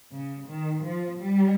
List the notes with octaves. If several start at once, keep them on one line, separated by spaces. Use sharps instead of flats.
C#3
D#3
F3
G3